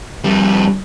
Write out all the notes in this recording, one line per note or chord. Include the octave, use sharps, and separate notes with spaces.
F2 G3